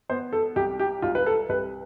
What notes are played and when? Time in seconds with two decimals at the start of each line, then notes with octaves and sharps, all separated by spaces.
0.09 B3 C5
0.33 A4
0.56 C2 G4
0.79 G4
1.02 C2 F4
1.15 B4
1.26 A4
1.49 C2 B4